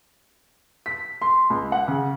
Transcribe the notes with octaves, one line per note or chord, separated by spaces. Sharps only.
B6
C6
C#2
F#5
C#3